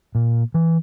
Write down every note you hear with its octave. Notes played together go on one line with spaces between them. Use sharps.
A#2
E3